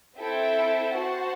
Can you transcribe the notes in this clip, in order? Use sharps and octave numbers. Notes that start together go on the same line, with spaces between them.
C4 E4 A4 E5 G5
F#4 C5 F#5 A5